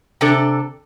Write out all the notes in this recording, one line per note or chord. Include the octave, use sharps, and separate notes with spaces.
C3 D4 A4